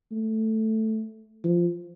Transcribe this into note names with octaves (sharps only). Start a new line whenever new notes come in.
A3
F3